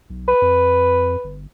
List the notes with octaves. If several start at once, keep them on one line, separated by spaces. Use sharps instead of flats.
B1
B4
F2
G1